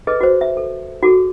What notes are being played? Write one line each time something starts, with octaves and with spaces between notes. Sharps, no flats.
G#4 A4 B4 D#5
F#4 C5
E5
A4
F#4 G#4 A4